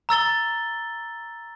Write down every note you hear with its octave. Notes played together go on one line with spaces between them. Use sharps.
A#5 E6 A6 G7